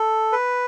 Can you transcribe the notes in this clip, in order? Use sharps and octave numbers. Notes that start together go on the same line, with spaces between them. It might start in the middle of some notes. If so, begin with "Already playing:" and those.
Already playing: A4
B4